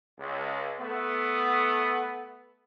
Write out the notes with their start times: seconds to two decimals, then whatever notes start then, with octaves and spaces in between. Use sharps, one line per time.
0.19 C#2
0.79 A3 B3